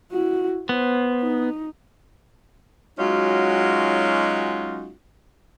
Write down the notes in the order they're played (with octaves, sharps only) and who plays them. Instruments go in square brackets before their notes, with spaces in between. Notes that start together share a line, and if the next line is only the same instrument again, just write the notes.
[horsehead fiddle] E4 F#4
[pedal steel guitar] B3 [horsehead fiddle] C5
[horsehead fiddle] D#4
[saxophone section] F#3 G#3 C#4 D#4 F4 F#4